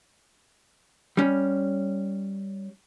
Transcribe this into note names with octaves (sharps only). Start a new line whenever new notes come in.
G3 C#4